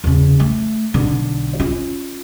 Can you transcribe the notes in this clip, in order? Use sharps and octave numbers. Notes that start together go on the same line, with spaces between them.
E2 C#3
A3
B1 D3
C#4 F4